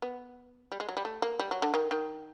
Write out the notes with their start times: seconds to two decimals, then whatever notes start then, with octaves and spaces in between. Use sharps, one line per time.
0.02 B3
0.72 G3
0.80 G#3
0.89 F#3
0.97 G3
1.05 A3
1.22 A#3
1.39 G3
1.51 F#3
1.62 D3
1.74 D#3
1.91 D#3